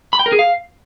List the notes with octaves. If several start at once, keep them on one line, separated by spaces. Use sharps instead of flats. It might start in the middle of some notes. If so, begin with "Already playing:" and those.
B5
G5
A#4
G#4
F5